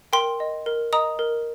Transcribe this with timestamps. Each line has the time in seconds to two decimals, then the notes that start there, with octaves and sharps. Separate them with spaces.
0.13 A#4 G5 C6
0.40 D#5
0.66 A#4
0.93 D#5 A#5 D#6
1.19 A#4